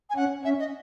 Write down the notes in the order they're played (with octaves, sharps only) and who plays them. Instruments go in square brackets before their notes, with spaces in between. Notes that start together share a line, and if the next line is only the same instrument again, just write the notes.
[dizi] G#5
[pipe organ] C#4 [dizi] F#5
[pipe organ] C#4 [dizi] E5
[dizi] D#5